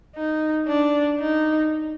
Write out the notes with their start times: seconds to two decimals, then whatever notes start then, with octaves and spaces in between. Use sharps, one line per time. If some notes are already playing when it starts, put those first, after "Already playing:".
0.16 D#4
0.67 D4
1.19 D#4